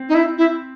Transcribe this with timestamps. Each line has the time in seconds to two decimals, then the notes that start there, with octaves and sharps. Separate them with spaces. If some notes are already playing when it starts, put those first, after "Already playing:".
Already playing: C4
0.09 D#4
0.14 E4
0.38 E4